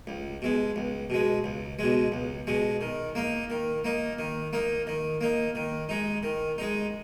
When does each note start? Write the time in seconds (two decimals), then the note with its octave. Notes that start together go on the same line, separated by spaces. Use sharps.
0.07 C#2
0.42 B2 G#3
0.76 C#2
1.10 B2 G#3
1.44 C#2
1.79 B2 G#3
2.12 C#2
2.47 B2 G#3
2.81 D#3
3.15 A#3 D#4
3.50 D#3
3.84 A#3 D#4
4.19 D#3
4.53 A#3 D#4
4.87 D#3
5.21 A#3 D#4
5.55 D#3
5.89 G#3 D#4
6.23 D#3
6.58 G#3 D#4